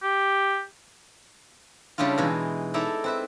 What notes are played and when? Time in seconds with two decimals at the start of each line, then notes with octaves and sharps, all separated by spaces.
0.03 G4
1.98 C#3 G3 D4 E4 F4
2.18 B2 E3 G#3 D#4
2.74 D#4 E4 A4 D5 E5 A#5
3.04 C4 B4 E5